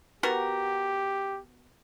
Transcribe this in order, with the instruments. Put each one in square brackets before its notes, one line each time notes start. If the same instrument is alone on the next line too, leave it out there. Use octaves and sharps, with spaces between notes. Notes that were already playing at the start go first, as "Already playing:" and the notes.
[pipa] B3 F#4 A#4 [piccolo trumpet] G4